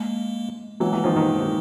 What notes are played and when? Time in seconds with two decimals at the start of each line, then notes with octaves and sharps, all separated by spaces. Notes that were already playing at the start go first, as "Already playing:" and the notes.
Already playing: G#3 A#3
0.80 E3 F#3 G#3 A#3
0.93 E3
1.04 D#3 F3
1.16 D#3
1.40 D#3